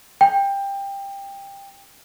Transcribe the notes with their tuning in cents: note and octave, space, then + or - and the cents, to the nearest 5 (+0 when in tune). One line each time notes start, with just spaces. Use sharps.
G5 +15